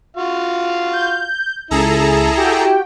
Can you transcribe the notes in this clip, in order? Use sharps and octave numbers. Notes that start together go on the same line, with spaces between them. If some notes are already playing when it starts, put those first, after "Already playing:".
F4 F#4 F5
G6
C#2 E4 G#4 A4 A#5
F#4 G4 G5